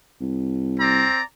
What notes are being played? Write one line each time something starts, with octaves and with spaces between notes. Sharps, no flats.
C2
C4 D5 A#5